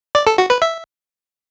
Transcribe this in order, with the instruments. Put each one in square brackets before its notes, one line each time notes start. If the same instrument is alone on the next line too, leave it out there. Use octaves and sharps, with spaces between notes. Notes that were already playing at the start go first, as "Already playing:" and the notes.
[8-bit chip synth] D5
A4
F#4
B4
E5